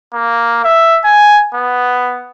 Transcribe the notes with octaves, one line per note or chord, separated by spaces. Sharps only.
A#3
E5
G#5
B3